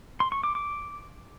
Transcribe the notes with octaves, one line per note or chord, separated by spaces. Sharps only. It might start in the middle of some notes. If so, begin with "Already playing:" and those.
C6
C#6
D6
D6